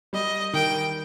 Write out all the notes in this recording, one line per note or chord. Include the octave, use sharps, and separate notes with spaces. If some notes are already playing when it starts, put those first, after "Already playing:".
G3 D#5
D#3 G5